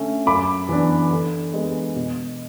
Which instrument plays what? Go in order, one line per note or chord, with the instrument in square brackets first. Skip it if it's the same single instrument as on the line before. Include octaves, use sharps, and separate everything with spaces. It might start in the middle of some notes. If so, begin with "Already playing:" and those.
Already playing: [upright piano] D3 A3 C#4 E5
F#2 B5 D6
E3 B3 D4
D3
G#3 B3
B2